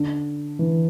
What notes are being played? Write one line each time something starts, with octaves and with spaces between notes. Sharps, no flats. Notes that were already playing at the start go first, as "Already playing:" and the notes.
Already playing: D3
E3